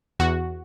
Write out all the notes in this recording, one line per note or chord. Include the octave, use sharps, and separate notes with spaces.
E2 F#4